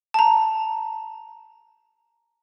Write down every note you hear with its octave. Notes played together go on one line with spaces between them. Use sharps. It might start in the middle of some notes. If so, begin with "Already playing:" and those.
A5 A#5